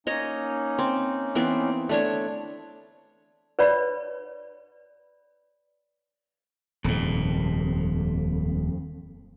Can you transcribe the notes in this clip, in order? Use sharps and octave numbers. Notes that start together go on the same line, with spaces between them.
A#3 C#4 D#4 C#5 D#5
C4
E3 B3 C4
A3 D4 C#5
B4 C#5 D5 B5
D#1 F2 G#2